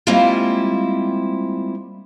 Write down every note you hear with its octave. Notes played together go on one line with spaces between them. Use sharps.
G3 G#3 A#3 C4 E4 F4